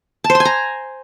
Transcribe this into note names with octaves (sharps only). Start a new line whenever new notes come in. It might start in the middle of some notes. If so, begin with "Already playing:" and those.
A5
C5
C6
G#5
A#5